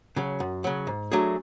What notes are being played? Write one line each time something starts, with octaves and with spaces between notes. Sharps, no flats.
C#3 F#3
F#2
C#3 F#3
G#2
F#3 A3 D4 G#4